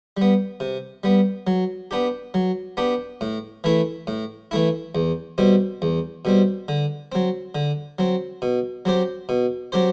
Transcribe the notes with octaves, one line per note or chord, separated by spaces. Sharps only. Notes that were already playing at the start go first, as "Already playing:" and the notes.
G3 B3
C3
G3 B3
F#3
B3 D4 G4
F#3
B3 D4 G4
A2
E3 A3 E4
A2
E3 A3 E4
E2
B2 G3 C4
E2
B2 G3 C4
D3
F#3 C4
D3
F#3 C4
B2
F#3 C4 G4 C5
B2
F#3 C4 G4 C5